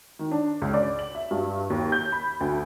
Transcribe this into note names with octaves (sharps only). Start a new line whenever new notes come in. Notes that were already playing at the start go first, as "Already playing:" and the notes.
D#3
D4
C#2
D5
F#7
E5
G2
D#2
G6
B5
D2